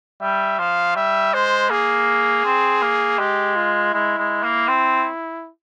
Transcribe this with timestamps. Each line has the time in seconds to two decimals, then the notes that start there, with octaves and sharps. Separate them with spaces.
0.21 G3 E5
0.59 F3 F5
0.96 G3 E5
1.33 G#3 C5
1.70 A#3 G#4
2.45 C4
2.82 A#3
3.19 G#3 G4
3.56 F4
3.93 G#3 E4
4.18 G#3
4.43 A#3
4.68 C4